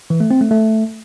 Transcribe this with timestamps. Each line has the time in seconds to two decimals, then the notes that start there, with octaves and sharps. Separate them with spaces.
0.10 E3
0.20 A3
0.31 C4
0.41 A3
0.51 A3